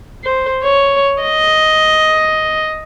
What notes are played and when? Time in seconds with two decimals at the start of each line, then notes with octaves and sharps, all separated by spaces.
0.24 C5
0.63 C#5
1.22 D#5